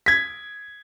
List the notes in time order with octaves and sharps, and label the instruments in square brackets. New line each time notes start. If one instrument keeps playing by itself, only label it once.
[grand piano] G#6 B6